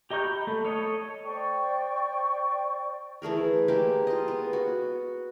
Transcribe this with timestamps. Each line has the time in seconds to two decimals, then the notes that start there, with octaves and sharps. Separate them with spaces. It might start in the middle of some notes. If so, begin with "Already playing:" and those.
0.10 G4 D#5 A#5 C#6 G6
0.24 B5
0.47 A3
0.65 A4 C#5 D#5
1.24 C5 D5 G5 C#6
3.22 E3 A3 G#4 A#4
3.68 G#3 A#3 G4 A#4
4.07 F4 D#5
4.28 B3
4.53 F#4